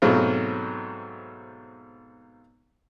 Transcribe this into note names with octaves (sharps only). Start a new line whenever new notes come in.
G#2 B2 F#3 A3 C4 F4